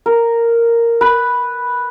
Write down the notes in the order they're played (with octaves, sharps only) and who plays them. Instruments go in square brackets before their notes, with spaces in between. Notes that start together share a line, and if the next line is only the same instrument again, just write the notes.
[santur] A#4
B4